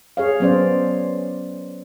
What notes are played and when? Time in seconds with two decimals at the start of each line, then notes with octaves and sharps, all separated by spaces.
0.17 G#4 C#5 F5
0.40 F#3 B3 C#4 C5 D5